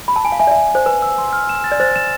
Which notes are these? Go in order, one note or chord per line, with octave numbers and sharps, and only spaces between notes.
B5
A5
G#5
F5
E5 G#5
D5
E5
G#5
C5 G#5
B4 G#5
E6
C6
F6
E7
A6
D5
C5 A6
E7